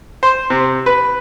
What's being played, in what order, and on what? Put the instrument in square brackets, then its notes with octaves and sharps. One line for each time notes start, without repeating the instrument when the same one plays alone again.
[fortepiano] C5
C3
B4